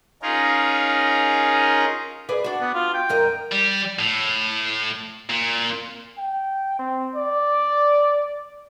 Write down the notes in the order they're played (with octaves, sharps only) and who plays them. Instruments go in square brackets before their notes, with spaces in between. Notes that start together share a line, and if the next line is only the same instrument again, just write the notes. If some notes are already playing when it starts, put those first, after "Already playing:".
[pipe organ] C#4 D#4 F4 G#4 A#4
[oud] G#4 B4 D5
D4 F#4
[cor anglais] B3
F4
G5
[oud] F#2 A#4 D#5
[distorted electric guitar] G3
A2
A#2
[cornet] G5
C4
D5